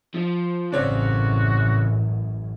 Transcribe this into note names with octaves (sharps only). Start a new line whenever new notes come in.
F3
A1 F#2 C#3 C4 F#4 C#5 D5